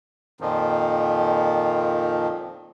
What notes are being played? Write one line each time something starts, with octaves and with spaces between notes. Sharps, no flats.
F2 A#2 D#3 F3